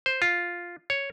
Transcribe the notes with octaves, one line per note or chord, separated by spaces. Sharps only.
C5
F4
C#5